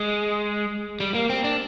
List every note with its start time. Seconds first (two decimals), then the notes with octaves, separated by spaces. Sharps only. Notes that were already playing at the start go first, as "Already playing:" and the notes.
Already playing: G#3
1.00 G3
1.14 A#3
1.30 C4
1.44 D4